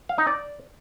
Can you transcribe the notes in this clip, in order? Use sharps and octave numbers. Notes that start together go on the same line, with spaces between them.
F5
D#4
D5